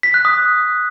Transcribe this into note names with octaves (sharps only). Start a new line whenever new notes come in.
B6
F#6
D#6